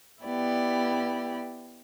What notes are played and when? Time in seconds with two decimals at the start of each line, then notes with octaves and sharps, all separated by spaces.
0.22 B3 E4 G4 D5